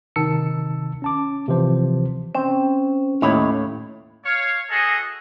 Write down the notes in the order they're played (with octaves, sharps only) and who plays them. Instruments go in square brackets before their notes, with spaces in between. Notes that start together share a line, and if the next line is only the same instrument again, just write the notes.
[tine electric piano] C3 D#3 A5 E6 C#7
C#4 A5 D6
C3 E3 F3 C5 A5
[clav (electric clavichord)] C4 [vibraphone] C#4
[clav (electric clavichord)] D#2 E4 [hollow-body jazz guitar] A2 C#5 B5
[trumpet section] C#5 F5
F#4 G#4 A4 D#5